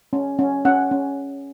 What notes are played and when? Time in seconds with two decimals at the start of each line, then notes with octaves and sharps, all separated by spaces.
0.13 C#4
0.39 C#4
0.65 C#4 F#5
0.91 C#4